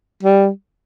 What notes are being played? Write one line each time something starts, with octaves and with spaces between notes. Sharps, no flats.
G3